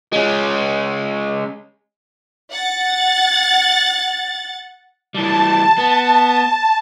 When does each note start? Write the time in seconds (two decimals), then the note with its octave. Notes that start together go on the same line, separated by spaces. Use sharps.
0.13 G#3 C#4
2.53 F#5 A6
5.15 E3 G3 A5
5.78 B3